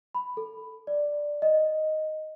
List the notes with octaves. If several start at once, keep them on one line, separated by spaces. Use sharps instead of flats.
B5
A4
D5
D#5